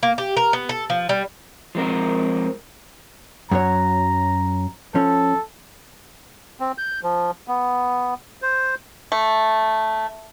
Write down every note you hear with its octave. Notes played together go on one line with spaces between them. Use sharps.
A#3
G4
A#4
B3
A4
F3
G3
F3 G#3 C4 A#4
F#2 F#3 C#5 A#5
F3 C#4 A4
C4
G6
F3
B3
C5
A3